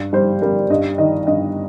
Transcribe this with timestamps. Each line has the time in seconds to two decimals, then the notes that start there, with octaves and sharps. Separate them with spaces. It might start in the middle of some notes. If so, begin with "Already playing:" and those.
Already playing: G2
0.13 G3 C5
0.41 G3 A#4
0.70 G2 D#5
0.98 D#3 D#5
1.27 G2 D#5